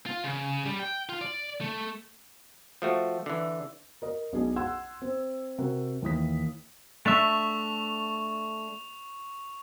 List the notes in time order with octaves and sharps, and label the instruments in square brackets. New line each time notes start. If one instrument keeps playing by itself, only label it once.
[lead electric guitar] F4
C#3
G3
G5
F4
D5
A3
[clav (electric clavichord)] F3 A3 F#4
D3 E3
[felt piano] A#4 D#5
B1 D4 G#4
F#5 C6 E6 G#6
C4
C3 F#4 A#4
D#2 E3 D#6 B6
[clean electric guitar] A3 D4 E5 [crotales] C#6 F7